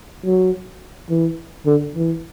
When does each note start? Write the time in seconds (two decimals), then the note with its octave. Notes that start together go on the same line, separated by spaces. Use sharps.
0.25 F#3
1.09 E3
1.66 D3
1.95 E3